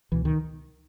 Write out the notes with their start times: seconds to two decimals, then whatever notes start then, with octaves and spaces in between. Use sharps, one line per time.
0.12 C#2 B2 E3
0.25 D#3